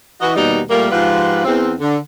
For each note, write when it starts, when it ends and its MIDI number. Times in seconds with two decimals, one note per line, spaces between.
0.20 0.35 52
0.20 0.35 66
0.20 0.35 75
0.36 0.60 39
0.36 0.60 47
0.36 0.60 55
0.36 0.60 63
0.68 0.87 46
0.68 0.87 55
0.68 0.87 57
0.68 0.87 58
0.91 1.44 44
0.91 1.44 53
0.91 1.44 65
0.91 1.44 67
0.91 1.44 71
0.91 1.44 78
1.45 1.73 40
1.45 1.73 60
1.80 1.96 50